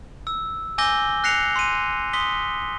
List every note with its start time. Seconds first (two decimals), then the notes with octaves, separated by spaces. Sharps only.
0.27 E6
0.78 G#5 D6 E6 G6 A#6 G7
1.24 F#6 A#6 C7 C#7 F7
1.56 C6 D#7
2.13 C6 D#6 B6 G7